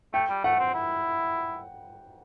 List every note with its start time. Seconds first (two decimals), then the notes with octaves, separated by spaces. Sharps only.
0.14 A3 G5
0.29 G3
0.44 A3 F#5
0.59 C4
0.74 E4